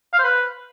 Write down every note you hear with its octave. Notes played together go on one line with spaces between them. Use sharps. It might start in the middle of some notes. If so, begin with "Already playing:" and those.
F5
C5
B4